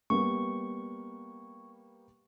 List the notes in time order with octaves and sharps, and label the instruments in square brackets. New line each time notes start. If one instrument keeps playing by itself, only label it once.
[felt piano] G3 A#3 B3 [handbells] C#6